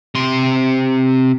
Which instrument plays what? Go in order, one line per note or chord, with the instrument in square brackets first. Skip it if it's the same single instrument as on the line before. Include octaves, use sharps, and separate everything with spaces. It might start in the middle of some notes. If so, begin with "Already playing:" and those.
[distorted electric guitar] C3 C6